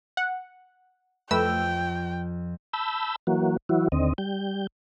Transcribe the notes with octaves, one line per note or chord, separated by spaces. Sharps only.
F#5
F2 A3 B4 G5 E6
A5 B5 E6 G6
E3 F#3 A#3 F#4
E3 F#3 E4 F#4
D#2 D3 C4 D#5
G3 G6